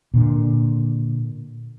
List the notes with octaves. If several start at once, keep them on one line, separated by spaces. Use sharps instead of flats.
A#2 D3